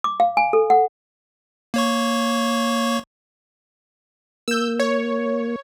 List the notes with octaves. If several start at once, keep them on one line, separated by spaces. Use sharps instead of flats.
D6
F5
G#5
A4
F#5
A#3 C#5 C#6
A#3 E6 G6
C#5